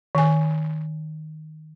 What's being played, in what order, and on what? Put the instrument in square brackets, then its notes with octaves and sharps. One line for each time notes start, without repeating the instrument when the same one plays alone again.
[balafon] D#3 G#5